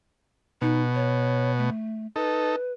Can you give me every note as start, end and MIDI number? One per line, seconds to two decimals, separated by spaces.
0.62 1.70 47
0.62 0.82 63
0.95 1.52 73
1.58 2.07 57
2.16 2.56 63
2.16 2.56 69
2.16 2.73 71